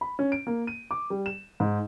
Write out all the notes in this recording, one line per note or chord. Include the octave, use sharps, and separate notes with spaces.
B5
C#4
D7
A#3
D#7
D6
G3
E7
G#2